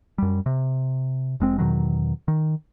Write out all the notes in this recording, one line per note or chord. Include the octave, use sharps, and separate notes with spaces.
F#2 G3
C3
F1 G#3 C4
E2 B2 D#3 F#3
D#3